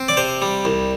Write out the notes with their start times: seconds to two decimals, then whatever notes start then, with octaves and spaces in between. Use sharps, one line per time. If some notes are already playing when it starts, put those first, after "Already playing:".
Already playing: C4
0.08 D5
0.17 C3 C5
0.42 G3
0.65 C2